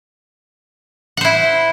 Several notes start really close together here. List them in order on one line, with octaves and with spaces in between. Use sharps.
F#5 C5 E4